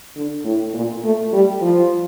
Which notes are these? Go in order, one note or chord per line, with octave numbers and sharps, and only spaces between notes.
D3
A2
A#2
A3
G3
F3